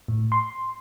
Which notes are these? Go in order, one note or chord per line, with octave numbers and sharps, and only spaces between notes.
A2
C6